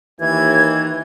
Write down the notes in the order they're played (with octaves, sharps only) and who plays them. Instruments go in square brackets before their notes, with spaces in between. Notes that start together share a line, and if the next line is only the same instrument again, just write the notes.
[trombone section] D#2 E3 [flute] G#6